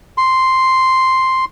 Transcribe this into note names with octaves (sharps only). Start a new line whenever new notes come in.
C6